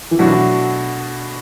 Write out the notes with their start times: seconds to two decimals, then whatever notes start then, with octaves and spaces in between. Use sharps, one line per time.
0.11 E3
0.19 B2 F#3 A3 D4 F#4